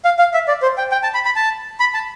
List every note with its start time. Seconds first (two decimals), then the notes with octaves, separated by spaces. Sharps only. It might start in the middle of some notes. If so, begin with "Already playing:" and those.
0.05 F5
0.19 F5
0.34 E5
0.48 D5
0.62 C5
0.78 G5
0.91 G5
1.03 A5
1.14 B5
1.25 B5
1.36 A5
1.80 B5
1.94 A5